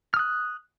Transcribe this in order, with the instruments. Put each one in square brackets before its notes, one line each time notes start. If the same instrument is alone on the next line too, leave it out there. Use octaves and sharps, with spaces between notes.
[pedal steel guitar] F6
D#6
F#6